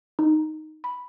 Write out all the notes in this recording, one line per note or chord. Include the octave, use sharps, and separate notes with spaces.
D#4
B5